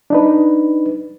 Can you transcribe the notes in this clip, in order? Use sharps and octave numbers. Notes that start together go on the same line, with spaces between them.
D4 D#4 B4